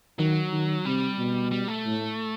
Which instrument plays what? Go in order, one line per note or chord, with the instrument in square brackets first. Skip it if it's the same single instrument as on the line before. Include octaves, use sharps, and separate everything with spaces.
[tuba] D#3 [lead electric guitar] F#3
[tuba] D#3
[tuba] C3 [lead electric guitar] G3
[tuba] B2
[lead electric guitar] G3
A3
[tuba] A2